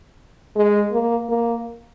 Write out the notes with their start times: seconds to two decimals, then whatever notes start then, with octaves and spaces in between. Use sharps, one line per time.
0.55 G#3
0.92 A#3
1.29 A#3